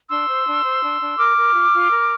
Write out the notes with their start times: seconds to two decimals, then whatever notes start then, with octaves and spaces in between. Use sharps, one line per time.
0.09 D4 C6 E6
0.28 C5
0.46 D4
0.63 C5
0.82 D4
1.01 D4
1.18 A#4 D6 F6
1.36 A#4
1.54 F4
1.72 F4
1.90 A#4